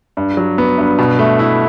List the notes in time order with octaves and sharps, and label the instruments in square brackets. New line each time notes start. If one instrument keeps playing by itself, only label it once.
[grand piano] G2
F#3
B3
G2
B2
A3
E4